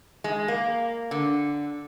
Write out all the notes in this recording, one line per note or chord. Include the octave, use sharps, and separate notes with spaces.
G#3
A#3
D3